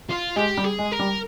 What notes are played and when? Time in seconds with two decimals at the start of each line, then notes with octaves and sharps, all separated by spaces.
0.09 F4
0.36 G#3 G4
0.57 G3
0.64 G#4
0.79 G#3
0.92 A#4
0.99 G3